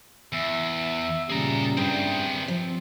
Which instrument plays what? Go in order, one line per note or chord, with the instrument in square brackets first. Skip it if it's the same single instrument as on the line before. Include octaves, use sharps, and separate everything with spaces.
[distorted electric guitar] E2 [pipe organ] E5
[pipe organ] A#2 C#3 G3 [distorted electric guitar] G#4 A#5
[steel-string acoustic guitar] G2 D4 E4 [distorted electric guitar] C4 G#4 [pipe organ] G5
[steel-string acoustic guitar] F3 [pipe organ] C4